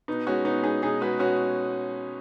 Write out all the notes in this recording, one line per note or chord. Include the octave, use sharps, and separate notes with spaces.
B2 B3 D#4
G#3 C#4 F#4
B2 B3 D#4
G#3 D#4 G#4
B2 D#4 G#4
G#3 F#4 B4
B2 C#4 F#4